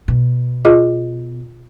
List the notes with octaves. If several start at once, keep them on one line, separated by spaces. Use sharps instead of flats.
B2
F4 G#4 D#5